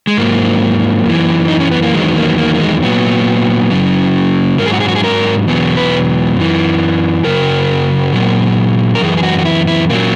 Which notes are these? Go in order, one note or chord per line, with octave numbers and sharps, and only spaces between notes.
G#3
G#2 F#3 A#3
F#2 E3
D#4
C#4
B3
A#3
E2 D#3 F#3 G#3
A#3
A#3
A#3
G#3
A#2 F#3 B3
F#2 C#3 F#3
G#2 F#3 A#4
G#4
F#4
G#4
F#4
G#4
A#4
E2 B2 F#3
B4
F#2 E3
F#2 C#3 F#3 A#4
A#2 F#3
A#4
F#2 E3 G#4
G#4
F#4
F#4
E4
E4
A#2 F#3 A#3